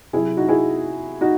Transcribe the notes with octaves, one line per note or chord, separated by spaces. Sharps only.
C3 F#3 E4 G#4
D#4 F#4
E4 G#4
D#4 F#4